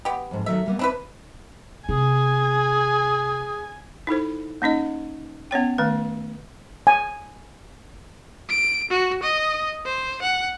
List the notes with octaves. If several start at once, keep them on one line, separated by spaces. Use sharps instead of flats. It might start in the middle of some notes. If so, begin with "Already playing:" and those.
B3 G4
F2 G#2
D#3 F#3 A3 E5
G3 A#3 B3
C4 D4 E4 B4
C3 G#4 G#5
D#4 E4 A4 C5
A#3 C#4 D#4 D#5
B3 C#4 C#5 G5
D#3 A3 B4
G#5
D7
F#4
D#5
C5
F#5